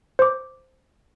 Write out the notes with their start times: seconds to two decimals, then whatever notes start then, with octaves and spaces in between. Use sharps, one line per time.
0.19 C5 D6